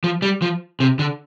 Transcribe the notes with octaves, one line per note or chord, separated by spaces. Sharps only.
F3
G3
F3
C3
D3